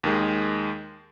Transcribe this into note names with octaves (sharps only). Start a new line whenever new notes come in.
D#2 D#3 G#3